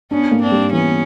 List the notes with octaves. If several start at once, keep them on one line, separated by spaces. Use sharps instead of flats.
B3 C#4 D4
A#3
C4 D4
G3
E3 B3 C#4